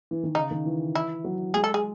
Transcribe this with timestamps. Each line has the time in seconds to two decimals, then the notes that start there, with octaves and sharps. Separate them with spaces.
0.11 E3
0.23 D#3
0.35 C#3 D#4
0.51 D#3
0.66 E3
0.95 E4
1.24 F#3
1.54 G#3 G#4
1.64 A4
1.74 G#4